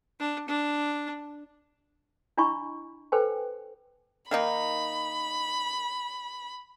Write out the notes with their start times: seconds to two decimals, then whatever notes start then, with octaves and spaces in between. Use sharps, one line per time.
0.20 D4
0.49 D4
2.37 D4 E4 D#5 G#5 B5 C#6
3.12 A4 B4 C5 G5 G#5
4.31 D#3 A#3 D#4 B5